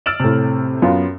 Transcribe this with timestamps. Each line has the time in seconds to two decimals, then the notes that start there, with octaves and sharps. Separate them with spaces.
0.06 E6 F6 A6 D7 E7 F#7
0.20 A2 C3
0.82 F#2 B3 F4